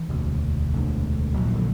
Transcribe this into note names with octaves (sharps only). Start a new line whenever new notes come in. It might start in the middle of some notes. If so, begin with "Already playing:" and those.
Already playing: E3
E1 D2 D3
E1 D2 D3
A#1 A#2 F#3
E3
D3 F#3